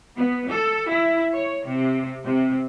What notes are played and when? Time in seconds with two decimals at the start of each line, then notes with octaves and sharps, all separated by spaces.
0.15 B3
0.50 A4
0.88 E4
1.33 C#5
1.65 C3
2.25 C3